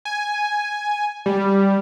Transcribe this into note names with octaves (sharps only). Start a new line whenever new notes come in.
G#5
G3